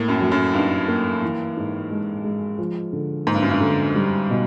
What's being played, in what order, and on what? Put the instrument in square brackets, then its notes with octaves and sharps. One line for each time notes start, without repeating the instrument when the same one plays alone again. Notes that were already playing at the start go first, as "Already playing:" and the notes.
Already playing: [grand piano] A2 [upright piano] A#3
[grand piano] F#2
[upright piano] F#3
[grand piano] F#2
[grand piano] G2 [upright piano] D#4
[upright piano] A#3
E3
G#2
G#3
G#3
F3
D3
[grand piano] G#2 [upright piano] A#3
[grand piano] G2
F#2
G2
[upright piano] D3
G3
B2